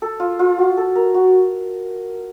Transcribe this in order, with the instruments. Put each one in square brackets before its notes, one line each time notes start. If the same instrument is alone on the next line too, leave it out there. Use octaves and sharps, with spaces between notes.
[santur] A4
F4
F4
F#4
A4
A#4
F#4